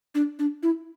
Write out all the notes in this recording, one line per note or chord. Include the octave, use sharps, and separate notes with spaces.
D4
D4
E4